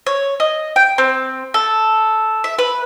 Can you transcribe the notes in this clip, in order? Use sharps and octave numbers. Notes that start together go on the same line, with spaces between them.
C#5
D#5
G5
C4
A4
E5
B4